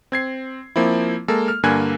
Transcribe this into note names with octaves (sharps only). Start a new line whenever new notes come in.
C4 G#6 C7
F3 A#3 C4 E4
G#3 A#3 A4
F6
G2 D3 A#3 G#5 F#6 G#6